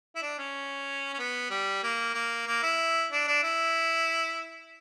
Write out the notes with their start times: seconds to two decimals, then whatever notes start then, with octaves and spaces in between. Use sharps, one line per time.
0.16 E4
0.22 D4
0.39 C#4
1.14 C#4
1.19 B3
1.50 G3
1.83 A#3
2.15 A#3
2.47 A#3
2.63 E4
3.12 D4
3.28 D4
3.44 E4